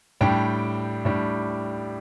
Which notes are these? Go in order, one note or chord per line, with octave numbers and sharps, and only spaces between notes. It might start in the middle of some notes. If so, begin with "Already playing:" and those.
A2 G3 D4 G5
A2 G3 D4